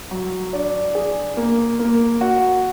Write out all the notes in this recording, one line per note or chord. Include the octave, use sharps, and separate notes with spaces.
F#3
D4
G#4
A#3
A#3
F#4